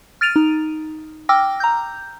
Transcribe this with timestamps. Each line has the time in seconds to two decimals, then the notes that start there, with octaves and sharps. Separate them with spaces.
0.21 F6 A6 D7 D#7 F7
0.36 D#4
1.29 G5 D6 E6 F6 A#6
1.60 A#5 G6